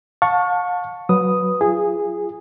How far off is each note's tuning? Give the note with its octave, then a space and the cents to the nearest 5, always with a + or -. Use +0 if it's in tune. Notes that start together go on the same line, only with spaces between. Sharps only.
F5 +40 A5 +10 C#6 +0
F#3 +0 B4 +0 D#6 +0
F4 -30 G#4 -15